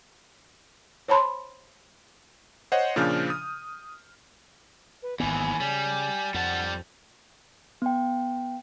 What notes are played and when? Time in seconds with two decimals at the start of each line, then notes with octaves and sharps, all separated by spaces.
1.08 C5 C#5 A5 B5 C6
2.72 C5 C#5 D#5 F#5
2.96 A#2 C#3 F3 D4 F6 G6
3.30 D#6
5.03 B4
5.20 G#1 D#2 E3 B3 G#5
5.60 C#3 G3
6.34 F2 G3 F#5 A5
7.82 B3 G5